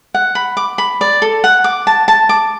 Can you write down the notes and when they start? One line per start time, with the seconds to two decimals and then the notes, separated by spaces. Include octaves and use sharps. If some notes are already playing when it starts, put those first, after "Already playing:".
0.14 F#5
0.35 B5
0.57 D6
0.78 B5
1.01 D5
1.22 A4
1.44 F#5
1.64 D6
1.87 A5
2.08 A5
2.29 D6